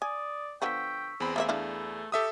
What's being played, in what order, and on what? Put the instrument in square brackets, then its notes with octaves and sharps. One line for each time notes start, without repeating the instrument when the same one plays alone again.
[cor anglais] D5 [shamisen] G#5 [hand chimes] D#6
[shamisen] D3 F3 B3 [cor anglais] G5 [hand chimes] C#6 E6 B6
[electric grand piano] E2 B5 [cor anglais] C4 [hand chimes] G#4
[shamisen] A3 A#3 E5 [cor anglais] C4
[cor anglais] A3 [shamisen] D4 E4 F5
[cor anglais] G4 [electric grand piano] A4 E5 D#6